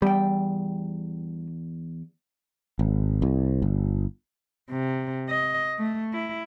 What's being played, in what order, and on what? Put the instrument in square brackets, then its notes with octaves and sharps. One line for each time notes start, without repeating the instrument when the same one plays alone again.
[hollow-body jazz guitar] E2 G5 [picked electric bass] G3
[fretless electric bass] G#1
C2
G1
[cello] C3
D#5
A3
E4